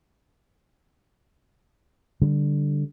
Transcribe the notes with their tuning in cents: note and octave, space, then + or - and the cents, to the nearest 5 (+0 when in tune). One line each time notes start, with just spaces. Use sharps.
D3 +0 G3 +5